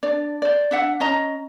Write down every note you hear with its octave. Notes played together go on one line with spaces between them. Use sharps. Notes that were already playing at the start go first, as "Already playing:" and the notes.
D4 D5
C5 D5
D4 E5 F#5
C#4 D#5 A#5